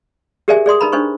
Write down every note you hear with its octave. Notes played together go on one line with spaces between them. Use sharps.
G4 G#4 A#4 D5 E5 G#5
G#4 D5 C6 D#6
D#4 A#4 B4 A#5 B5
D4 D#4 B4 C5 C#6